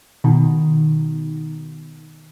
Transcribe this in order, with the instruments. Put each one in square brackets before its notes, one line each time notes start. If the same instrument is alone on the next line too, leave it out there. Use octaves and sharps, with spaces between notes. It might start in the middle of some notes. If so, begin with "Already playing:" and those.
[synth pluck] B2 D#3